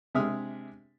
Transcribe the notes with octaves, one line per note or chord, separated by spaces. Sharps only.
C3 G#3 D4 E5 D#6 F6